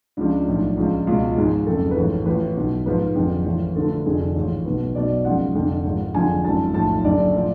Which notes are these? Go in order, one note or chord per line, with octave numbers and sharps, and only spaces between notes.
C#2 C#3 F3 D4
B1 A2 F3
C#2 C#3 F3
C#2 B2 F4
G#1 G#2 F3 G#4
F#1 F2 C#3 A4
B4
A1 G#2 F3 A4
A1 A2 F3 B4
B1 B2
G#1 G#2 F3 B4
F#1 F2 D3 F3
A1 A2 F3
D2 D3 F3 A4
F1 F2 D3 F3 G#4
A1 G#2 F3
B1 B2 B4
B1 B2 D5
G#1 F#2 C#3 F3 F#5
F1 F2 D3
G#1 G#2 F3
F#1 F2 D3 F3 G#5
G#1 F#2 C#3 F3 A5
B1 A2 F3 A5
F#1 F#2 D3 D5
A2 F3